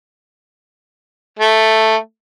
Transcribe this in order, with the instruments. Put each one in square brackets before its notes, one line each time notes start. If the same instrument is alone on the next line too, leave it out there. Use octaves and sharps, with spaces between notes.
[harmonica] A3